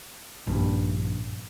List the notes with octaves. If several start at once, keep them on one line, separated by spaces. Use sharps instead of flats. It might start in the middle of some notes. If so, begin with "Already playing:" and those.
A#1 G2